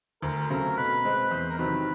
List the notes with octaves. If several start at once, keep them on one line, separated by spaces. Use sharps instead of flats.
D2 A#4
C#3 F#3 A3 C4 A#4
B2 B4
G#3 C4
E2 C5
A#4
C3 D#3 F#3 B4